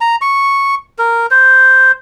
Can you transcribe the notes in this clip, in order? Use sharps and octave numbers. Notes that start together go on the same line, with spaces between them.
A#5
C#6
A#4
C5